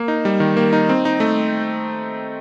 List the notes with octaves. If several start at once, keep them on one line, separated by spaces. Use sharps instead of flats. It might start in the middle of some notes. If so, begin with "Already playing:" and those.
Already playing: A#3
D#4
G3
D#3
A#3
D#4
C4
D#4
A3